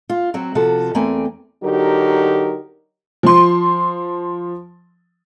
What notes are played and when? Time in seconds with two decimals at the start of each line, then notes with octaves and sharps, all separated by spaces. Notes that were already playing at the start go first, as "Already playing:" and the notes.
0.09 F4
0.34 F#3 C4 F#4
0.55 C3 F3 F#4 A4
0.95 E2 A3 A#3 C4 G5 G#5
1.64 D3 F#3 D#4 F#4 G4 A#4
3.23 F3 C6